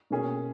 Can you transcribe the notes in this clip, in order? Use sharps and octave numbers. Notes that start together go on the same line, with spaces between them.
B2 A#3 C#4 G#4